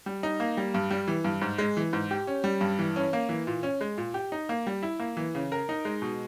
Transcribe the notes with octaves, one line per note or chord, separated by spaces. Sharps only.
G3
D#4
A#3
G3
G2
G3
E3
G2
G#2
G#3
E3
G#2
G4
C#4
G3
G2
E3
C#4
A#3
E3
A#2
C#4
G#3
A#2
G4
D#4
A#3
G3
E4
A#3
E3
C#3
A#4
D#4
G#3
B2